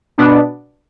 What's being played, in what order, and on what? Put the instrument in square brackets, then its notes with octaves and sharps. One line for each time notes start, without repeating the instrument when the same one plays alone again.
[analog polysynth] B2 B3 D4